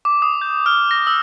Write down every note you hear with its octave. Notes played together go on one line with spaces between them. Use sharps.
D6
D#6
G6
F6
A#6
E6